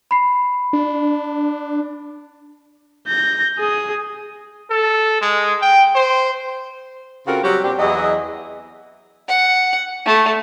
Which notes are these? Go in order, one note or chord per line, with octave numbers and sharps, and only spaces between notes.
B5 C7
D4
G6 A#6
G#4 D#6
A4
G#3
G5
C5
C#3 C4 F4 F#4 A4 A#4
F#3 G3 C4 F#4 G4
A#2 C4 D4 G4
E2 F#3 E4 G#4 D#5
F#5
A3